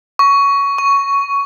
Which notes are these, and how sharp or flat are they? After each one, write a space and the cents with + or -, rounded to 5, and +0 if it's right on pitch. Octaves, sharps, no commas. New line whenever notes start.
C#6 +15
C#6 +5